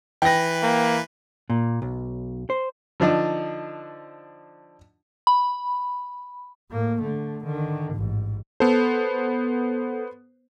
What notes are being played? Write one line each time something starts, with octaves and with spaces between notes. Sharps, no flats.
E3 B4 G5 A#6
A#3
A#2
B1
C5
D3 F3 D4 D#4
B5
A2 A#3
D3 A3
D3 D#3
A1 G#2
B3 A4 C5